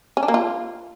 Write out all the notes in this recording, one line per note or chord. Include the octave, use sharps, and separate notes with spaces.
C#4
D4
A#3
F4